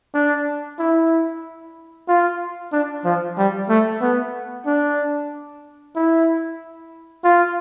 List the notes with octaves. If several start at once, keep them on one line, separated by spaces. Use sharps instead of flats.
D4
E4
F4
D4
F3
G3
A3
B3
D4
E4
F4